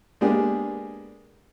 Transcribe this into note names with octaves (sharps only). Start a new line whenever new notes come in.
G#3 A#3 B3 D4 G4 G#4